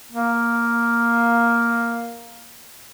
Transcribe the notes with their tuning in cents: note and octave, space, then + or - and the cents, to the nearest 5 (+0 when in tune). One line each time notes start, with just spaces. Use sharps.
A#3 +0